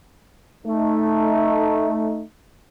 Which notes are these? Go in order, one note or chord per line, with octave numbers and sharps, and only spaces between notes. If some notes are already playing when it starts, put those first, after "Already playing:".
A3 D#4